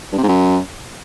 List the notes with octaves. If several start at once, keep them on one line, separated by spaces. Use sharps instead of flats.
G2
C3
G#2
F#2